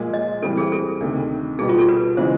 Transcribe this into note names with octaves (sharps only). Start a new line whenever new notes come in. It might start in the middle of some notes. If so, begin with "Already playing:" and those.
Already playing: A#2 F3 G#3
D#5
E3 G3 C4 A4
G#4
A4
D2 C3 D#3
B2 G3 B3 G#4
F4
A4
B4
C#3 E3 G#3 B3 C5